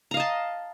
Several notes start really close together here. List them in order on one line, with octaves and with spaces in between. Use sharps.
A#5 F5 D#5 A5